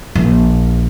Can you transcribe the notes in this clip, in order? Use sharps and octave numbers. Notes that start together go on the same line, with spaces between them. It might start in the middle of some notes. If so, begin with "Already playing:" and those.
A#1